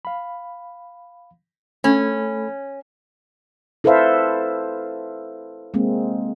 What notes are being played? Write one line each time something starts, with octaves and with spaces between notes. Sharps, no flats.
F5 B5
A3 C#4 A4 B5
E4 A4 B4 C5 E5 F5
G#3 A#3 C4